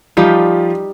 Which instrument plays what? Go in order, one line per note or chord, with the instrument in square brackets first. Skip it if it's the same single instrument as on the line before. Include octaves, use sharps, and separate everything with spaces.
[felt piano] F3 F4 [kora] G3 D#4 G4